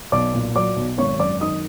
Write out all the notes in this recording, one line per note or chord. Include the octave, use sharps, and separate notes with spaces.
B1 D5 D6
A#2
F#3 D5 D6
B1
G#1 C#5 C#6
F#2 D5 D6
D#3 D#5 D#6